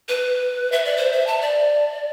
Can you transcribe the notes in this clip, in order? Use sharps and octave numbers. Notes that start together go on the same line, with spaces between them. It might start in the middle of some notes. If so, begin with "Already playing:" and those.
B4
E5
D5
C5
E5
A5
D5